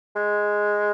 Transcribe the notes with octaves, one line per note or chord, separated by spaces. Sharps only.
G#3